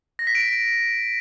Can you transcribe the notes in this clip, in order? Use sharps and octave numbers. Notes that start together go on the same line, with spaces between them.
A#6
B6
D7